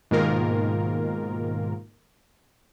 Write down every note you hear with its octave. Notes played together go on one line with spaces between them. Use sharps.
G#2 B2 D#3 A#3 F4 A#4